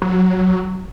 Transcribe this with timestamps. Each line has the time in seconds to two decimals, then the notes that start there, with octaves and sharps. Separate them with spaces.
0.02 F#3